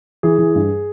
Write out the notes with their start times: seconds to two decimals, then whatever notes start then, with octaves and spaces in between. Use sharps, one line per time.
0.23 E3 G#4
0.38 E3
0.55 G2